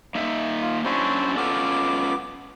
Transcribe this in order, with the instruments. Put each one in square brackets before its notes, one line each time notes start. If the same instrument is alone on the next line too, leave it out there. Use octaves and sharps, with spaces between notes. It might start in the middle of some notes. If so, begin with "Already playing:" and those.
[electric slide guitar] A#3 D#4 E5
[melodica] F4
[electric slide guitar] F#3 C#4 D4 [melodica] E4 F#4 C5
[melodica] B3 D6 [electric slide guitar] C#4 F4 A4